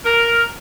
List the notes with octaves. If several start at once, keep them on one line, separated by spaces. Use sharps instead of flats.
A#4